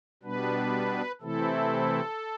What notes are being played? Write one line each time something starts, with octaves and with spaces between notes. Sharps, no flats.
B2 G3 B3 D4 B4
C3 E3 A3 C4 E4 A4